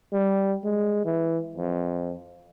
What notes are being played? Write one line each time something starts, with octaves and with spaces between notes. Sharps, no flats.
G3
G#3
E3
F2